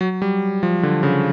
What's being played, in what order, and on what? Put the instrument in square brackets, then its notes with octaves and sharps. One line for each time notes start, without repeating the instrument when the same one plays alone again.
[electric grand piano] F#3
G3
F3
D3
C#3